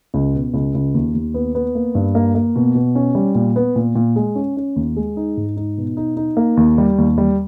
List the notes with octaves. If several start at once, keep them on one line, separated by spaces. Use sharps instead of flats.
C#2
B2
C#2
C#2
D#2
D#2
B3
B3
A#3
G2
A#3
A#3
B2
B2
C#4
G3
A#2
B3
A#2
A#2
G#3
C#4
C#4
D#2
G#3
D#4
G#2
D#4
B2
D#4
D#4
A#3
D#2
G3
D#2
G3